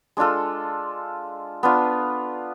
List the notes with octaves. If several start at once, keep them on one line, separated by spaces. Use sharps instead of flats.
G#3 D4 F4 A4
B3 D4 F4